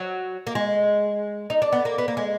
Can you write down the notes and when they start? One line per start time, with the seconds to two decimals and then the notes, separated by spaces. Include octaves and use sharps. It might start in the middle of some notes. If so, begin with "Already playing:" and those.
Already playing: F#3
0.47 A#3
0.55 G#3
1.50 D#4
1.62 D4
1.72 B3
1.85 A#3
1.98 B3
2.08 A#3
2.17 G#3